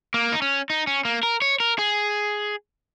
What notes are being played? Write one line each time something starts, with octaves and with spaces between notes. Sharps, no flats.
A#3
D#4
C#4
D#4
C#4
A#3
A#4
C#5
A#4
G#4